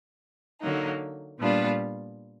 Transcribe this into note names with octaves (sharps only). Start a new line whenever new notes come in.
D3 F#3 A#3 D#4
A#2 G3 B3 D4 F4